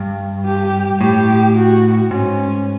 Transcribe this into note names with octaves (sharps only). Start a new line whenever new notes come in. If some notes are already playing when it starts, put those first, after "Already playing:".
Already playing: G2
G4
A2 G4
F#4
G#2 C#4